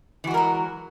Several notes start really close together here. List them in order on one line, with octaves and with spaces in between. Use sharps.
E3 F#4 G#3 A#4 F#3